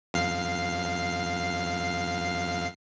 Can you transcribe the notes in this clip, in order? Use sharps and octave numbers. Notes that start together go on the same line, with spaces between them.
F2 F5 C7